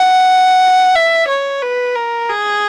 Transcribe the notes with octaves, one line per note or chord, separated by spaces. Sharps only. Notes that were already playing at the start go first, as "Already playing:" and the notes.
Already playing: F#5
E5
C#5
B4
A#4
G#4